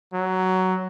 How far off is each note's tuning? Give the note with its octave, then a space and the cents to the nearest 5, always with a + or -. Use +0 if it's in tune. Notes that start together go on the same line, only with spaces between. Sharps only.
F#3 +10